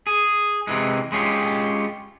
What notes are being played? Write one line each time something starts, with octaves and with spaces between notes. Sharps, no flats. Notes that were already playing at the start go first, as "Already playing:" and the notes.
G#4
C3 E3 G#3
G#3 C#4 F4 G4